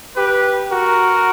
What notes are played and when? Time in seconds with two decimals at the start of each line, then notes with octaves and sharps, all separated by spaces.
0.17 G4 B4
0.72 F#4 A#4